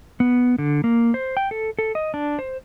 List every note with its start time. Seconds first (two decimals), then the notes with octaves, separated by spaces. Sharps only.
0.20 B3
0.58 D3
0.84 A#3
1.14 C5
1.37 G5
1.51 A4
1.79 A4
1.95 D#5
2.14 D4
2.39 C5